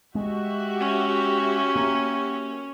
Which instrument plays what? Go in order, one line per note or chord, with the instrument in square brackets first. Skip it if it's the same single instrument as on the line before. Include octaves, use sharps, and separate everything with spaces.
[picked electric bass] G#3 [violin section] F#4 G4 E5
[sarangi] C#4
[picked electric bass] A#3